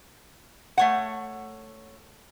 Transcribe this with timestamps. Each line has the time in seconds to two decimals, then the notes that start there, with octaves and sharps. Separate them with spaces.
0.77 A3 C#5 F#5